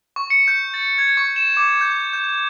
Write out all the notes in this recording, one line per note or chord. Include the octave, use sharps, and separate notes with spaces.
C#6
C#7
G6
A6
G#6
C#6
E7
D6
G6
G6